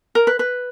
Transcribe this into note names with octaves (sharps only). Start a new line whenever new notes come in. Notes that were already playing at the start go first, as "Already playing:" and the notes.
A#4
B4
B4